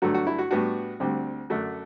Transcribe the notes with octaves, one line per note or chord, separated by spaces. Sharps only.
G2 D3 F#3 A3 F#4
F#4
E4
F#4
A2 G3 B3 D4 F#4
D2 D3 G3 C4
F#2 D3 A3 D4 F#4